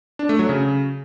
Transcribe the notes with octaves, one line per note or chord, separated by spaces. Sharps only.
D4
A3
F#3
C#3